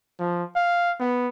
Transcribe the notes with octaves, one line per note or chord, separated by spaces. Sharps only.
F3
F5
B3